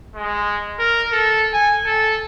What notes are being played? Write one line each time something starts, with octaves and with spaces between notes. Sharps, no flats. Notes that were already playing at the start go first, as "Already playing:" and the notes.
G#3
A#4
A4
G#5
A4